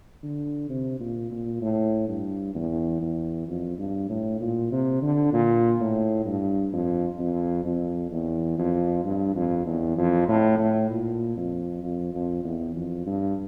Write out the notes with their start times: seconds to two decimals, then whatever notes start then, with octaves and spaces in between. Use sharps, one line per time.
0.23 D3
0.69 C3
1.00 A#2
1.31 A#2
1.62 A2
2.08 G2
2.55 E2
3.01 E2
3.48 F2
3.78 G2
4.10 A2
4.41 A#2
4.71 C3
5.02 D3
5.33 A#2
5.80 A2
6.26 G2
6.73 F2
7.19 F2
7.65 F2
8.12 E2
8.58 F2
9.05 G2
9.35 F2
9.66 E2
9.97 F2
10.28 A2
10.59 A2
10.90 A#2
11.37 F2
11.83 F2
12.14 F2
12.44 E2
12.75 F2
13.06 G2